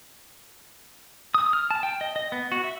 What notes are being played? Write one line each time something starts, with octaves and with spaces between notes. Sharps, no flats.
D#6
F6
A5
G5
D#5
D#5
B3
F#4
E5